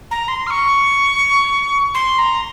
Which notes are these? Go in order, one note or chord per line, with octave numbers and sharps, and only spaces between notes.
A#5
C6
F6
C#6
C6
A#5